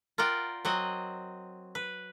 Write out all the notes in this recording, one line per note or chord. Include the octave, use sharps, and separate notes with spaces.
F4 A#4 D5 F#5 G5
F#3 C4 D#5 F#5
B4